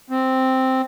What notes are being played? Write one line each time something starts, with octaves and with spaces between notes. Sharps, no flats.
C4